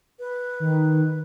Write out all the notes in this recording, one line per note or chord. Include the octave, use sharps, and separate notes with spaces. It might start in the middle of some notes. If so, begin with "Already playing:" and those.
B4
D#3